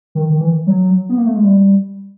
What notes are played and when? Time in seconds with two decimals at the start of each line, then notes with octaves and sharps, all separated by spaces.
0.15 D#3
0.30 D#3
0.41 E3
0.67 F#3
1.09 B3
1.18 A#3
1.26 A3
1.35 G#3
1.43 G3